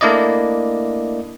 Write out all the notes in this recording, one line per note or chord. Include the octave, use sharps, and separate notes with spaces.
A3 A#3 D4 E4 D5 D#5